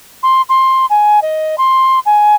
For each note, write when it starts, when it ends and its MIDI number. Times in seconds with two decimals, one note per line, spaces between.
0.23 0.42 84
0.49 0.86 84
0.90 1.20 80
1.22 1.56 75
1.58 1.99 84
2.06 2.36 80